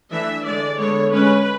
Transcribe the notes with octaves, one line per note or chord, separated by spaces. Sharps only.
E3 A3 D4 E5
D3 G#3 D4 D5
D3 G#3 B3 C#5
G#3 C#4 B4